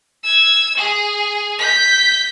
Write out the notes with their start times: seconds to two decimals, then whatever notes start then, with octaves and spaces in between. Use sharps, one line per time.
0.24 E6 G#6
0.77 G#4
1.59 G6 B6